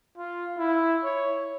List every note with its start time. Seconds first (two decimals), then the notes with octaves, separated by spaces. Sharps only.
0.17 F4
0.58 E4
1.04 C#5